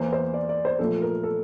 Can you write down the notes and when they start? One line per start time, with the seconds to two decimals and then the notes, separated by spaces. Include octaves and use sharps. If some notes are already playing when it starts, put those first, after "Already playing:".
Already playing: E2 E3 A#3 C5
0.13 C5
0.34 D5
0.49 D5
0.65 C5
0.79 A#2 F3 A3 A4
1.02 A#4
1.23 A4